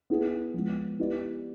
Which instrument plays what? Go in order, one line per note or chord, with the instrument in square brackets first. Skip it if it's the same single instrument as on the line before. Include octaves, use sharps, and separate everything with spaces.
[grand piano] B3 E4 G#4
F3 G#3 B3
B3 E4 G4 B4 D5